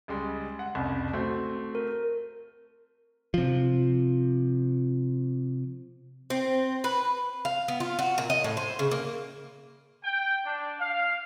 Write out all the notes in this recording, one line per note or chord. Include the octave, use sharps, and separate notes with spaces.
C#2 G3 G#3
F#5
C2 F2 C#3
A3 C4 F#4
A#4
C3 F3
C4
B4
F5
B3
F4
F#4
A#2
D#5
A2
C5
C#3
A#3
G5
D4
F5